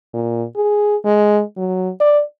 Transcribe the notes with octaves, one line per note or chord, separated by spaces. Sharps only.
A#2
G#4
G#3
F#3
D5